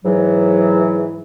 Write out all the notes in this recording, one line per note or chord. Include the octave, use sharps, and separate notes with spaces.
G#2 E3 F#3